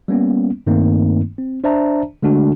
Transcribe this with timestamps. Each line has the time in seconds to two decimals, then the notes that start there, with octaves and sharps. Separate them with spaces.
0.08 G3 A#3 B3 C#4
0.67 G2 D#3 A3 A#3 C4 D#4
1.38 C4
1.64 D4 C5 D5 E5 A5 A#5
2.23 D3 G#3 A3 D4 F#4